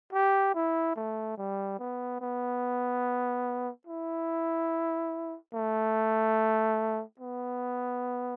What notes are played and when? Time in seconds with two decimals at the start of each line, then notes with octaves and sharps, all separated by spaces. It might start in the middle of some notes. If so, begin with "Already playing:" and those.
0.13 G4
0.55 E4
0.96 A3
1.38 G3
1.79 B3
2.21 B3
3.87 E4
5.54 A3
7.19 B3